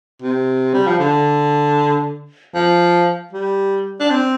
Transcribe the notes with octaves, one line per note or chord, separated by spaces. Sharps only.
C3
G3
F3
D3
F3
G3
D4
C4